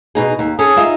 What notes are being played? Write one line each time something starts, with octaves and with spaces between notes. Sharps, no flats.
B2 D#4 G#4
D#2
C#4 G#4 A4
D#4 F4 E5